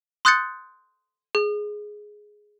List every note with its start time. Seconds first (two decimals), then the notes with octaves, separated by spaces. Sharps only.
0.25 C6 D#6 F#6 G6 A6 C#7
1.35 G#4